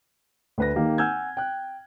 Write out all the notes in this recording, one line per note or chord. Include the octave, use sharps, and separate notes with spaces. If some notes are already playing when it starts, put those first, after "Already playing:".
D2 B4 A#6
D#3 A#3 G4
F#5 G#5 E6 F6 G6 G#6
G5 F#6